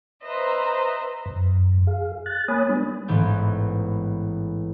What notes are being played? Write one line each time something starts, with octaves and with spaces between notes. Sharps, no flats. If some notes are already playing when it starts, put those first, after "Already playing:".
B4 C5 D#5 E5 A#5
F#2
G#4 F5
F#6 A6
A#3 C#5 G#5 B5 D#6
G3 B3 D4
A1 G#2 E3 B3 G6